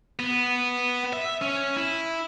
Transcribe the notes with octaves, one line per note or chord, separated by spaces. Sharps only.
B3
E5
C#4
E4